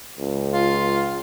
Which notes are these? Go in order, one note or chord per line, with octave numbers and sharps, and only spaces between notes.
C#2
F4